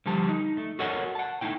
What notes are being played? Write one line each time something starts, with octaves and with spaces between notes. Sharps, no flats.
D3 F3 G3 G4 A5
D#4
A3
F#4 A4 A#4 C#5 D#5 F#5
F#5 A5
A3 D#4 E4 G5